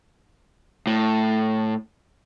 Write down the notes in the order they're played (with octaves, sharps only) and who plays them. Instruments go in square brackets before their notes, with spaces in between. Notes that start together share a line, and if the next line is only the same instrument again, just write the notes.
[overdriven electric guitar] A2